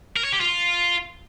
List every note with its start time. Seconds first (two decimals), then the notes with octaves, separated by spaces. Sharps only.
0.16 A#4
0.24 C#5
0.32 G4
0.40 F4